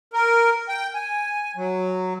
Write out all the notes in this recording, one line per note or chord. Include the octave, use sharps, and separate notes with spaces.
A#4
G5
G#5
F#3